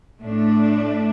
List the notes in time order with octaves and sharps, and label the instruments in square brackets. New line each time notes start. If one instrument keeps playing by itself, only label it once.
[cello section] A2 A3 D4